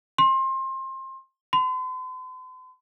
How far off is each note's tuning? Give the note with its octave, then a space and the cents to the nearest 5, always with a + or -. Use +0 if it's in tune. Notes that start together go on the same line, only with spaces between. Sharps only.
C6 +25
C6 -45